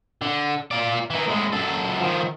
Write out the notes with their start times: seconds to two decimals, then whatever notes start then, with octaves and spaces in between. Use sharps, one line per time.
0.22 D3
0.71 F4 D5
1.10 E3 D#4
1.27 A2 G#3
1.52 F#2 A4
2.00 D#3 F3